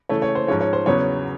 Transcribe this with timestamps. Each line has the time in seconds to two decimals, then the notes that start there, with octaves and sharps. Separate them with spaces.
0.09 C#3 E3 A3 C#5
0.22 C#5
0.35 C5
0.47 G#2 F3 G#3 C#4 C#5
0.61 C#5
0.73 C5
0.86 E2 C#3 F#3 B3 C#5